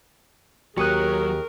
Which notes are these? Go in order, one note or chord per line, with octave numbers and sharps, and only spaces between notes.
D#2 F#3 G4 G#4 A#4 C#6 D#6 F#6